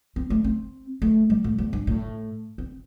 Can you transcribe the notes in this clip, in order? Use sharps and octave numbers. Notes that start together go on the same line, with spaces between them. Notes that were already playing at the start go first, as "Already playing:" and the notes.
C4
A3
C4
A3
G3
A2
E2
G2
A2
C4